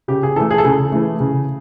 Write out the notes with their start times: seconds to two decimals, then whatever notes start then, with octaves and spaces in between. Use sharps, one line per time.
0.08 C#3 G4
0.23 G#4
0.36 E3 A3 A4
0.51 G#4
0.58 A4
0.65 C#3 G#4
0.92 E3 A3
1.20 C#3